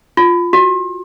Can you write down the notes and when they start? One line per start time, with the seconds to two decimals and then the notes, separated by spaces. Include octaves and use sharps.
0.17 F4
0.53 F#4